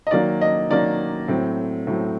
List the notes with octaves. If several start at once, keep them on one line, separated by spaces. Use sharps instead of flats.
D#5
D#3 F#3 A#3 D5
D#5
D#3 F#3 A#3 D5
A2 F#3 C4
A2 F#3 C4